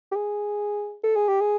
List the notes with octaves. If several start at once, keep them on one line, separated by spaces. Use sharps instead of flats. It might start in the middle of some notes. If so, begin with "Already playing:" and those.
G4
G#4
A4
G#4
G4
G#4